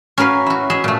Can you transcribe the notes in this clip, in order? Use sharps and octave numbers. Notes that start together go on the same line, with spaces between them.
C#4 F#4 A#4 B4 F5
E4 F#4
G#4 D#5 E5
A#2 A3